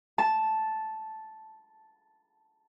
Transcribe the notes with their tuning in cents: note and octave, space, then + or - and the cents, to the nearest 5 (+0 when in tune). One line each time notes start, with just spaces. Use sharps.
A5 -5